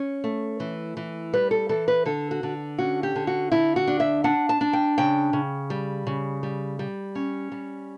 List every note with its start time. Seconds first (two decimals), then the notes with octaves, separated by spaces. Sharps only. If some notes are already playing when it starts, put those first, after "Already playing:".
Already playing: C#4 C#5
0.24 A3
0.60 E3
0.97 E3
1.33 G3 B4
1.51 A4
1.69 E3 A4
1.88 B4
2.06 D3 A4
2.31 F#4
2.43 D3
2.78 C#4 F#4
3.03 G4
3.16 D3
3.27 F#4
3.52 D3 E4
3.76 F#4
3.88 D4
4.00 E5
4.24 D4 F#5
4.49 A5
4.61 D4
4.73 G5
4.98 C#3 G5
5.33 C#3
5.70 G3
6.07 C#3
6.43 G3
6.79 G3
7.15 C#4
7.52 G3